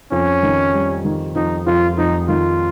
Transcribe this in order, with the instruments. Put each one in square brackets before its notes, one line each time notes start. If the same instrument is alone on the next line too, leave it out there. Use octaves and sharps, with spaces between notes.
[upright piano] F2 [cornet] C#4
[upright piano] D#3
G3
D#3
[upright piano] F2 [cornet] D#4
[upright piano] F2 [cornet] F4
[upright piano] F2 [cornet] D#4
[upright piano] D#3 [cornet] F4